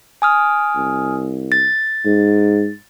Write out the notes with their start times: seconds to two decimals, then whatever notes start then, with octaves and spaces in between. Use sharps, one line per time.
0.22 G#5 D#6 F6
0.75 C2
1.52 A6
2.06 G#2